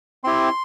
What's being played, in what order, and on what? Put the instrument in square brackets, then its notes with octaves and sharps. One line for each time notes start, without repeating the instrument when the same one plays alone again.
[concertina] C4 E4 G4 C6